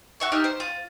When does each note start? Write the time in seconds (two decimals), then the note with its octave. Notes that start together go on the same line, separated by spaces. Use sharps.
0.20 F#4 E5 C#6
0.32 D4 D#4 G4 F6
0.44 C5
0.60 F4